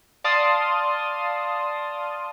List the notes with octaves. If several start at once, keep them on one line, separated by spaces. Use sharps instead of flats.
D5 F5 A5 C6 D#6